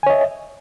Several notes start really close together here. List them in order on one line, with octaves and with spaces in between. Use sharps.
G#5 C#5 D#5 E5